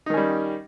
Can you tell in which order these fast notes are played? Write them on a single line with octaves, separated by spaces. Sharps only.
D#4 D#3 C#4 G3